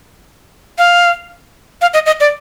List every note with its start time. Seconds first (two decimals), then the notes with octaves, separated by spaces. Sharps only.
0.78 F5
1.82 F5
1.94 D#5
2.06 D#5
2.20 D5